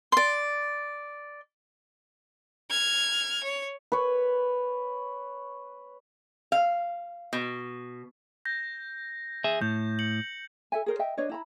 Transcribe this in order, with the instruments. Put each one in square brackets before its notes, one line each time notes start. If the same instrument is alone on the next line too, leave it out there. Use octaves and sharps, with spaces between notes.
[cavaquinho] D5 C6
[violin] F6 G#6
C#5
[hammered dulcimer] B4 C#5
[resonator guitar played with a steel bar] F5
B2
[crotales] G6 A#6
[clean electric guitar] G#4 E5
[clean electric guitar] A2 [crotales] G6
[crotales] C#7 F#7
[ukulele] A4 E5 G#5
G#4 A#4 C5
D#5 E5 G5
D4 B4 C#5 D#5
E4 A#5 B5